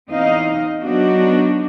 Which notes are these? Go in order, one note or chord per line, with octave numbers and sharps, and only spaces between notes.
E2 C4 D#4 D#5 F5
F#3 B3 D4 D#4 F#4